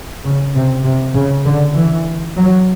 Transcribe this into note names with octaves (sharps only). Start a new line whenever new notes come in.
C#3
C3
C3
C#3
D3
E3
F#3